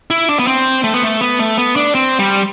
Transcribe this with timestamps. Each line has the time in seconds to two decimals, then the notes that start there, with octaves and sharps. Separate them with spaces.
0.10 E4
0.29 D4
0.39 B3
0.47 C4
0.84 A3
0.94 B3
1.03 A3
1.21 B3
1.39 A3
1.58 B3
1.76 D4
1.95 C4
2.19 G3